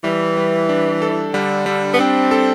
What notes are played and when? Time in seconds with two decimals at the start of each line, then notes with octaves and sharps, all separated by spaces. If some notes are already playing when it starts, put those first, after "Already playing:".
0.04 E3 G3
0.37 G3
0.69 D4
1.02 A4
1.34 D3 G3
1.66 G3
1.93 B3
1.99 C4 D4
2.31 A4